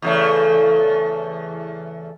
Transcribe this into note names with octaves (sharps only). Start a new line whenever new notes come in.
E2 C#3 A3